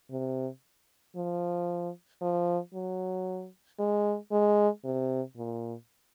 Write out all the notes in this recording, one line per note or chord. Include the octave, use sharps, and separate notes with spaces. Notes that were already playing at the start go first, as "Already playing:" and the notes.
C3
F3
F3
F#3
G#3
G#3
C3
A#2